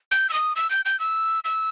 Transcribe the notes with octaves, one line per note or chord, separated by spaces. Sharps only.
G6
E6
D#6
E6
G6
G6
E6
E6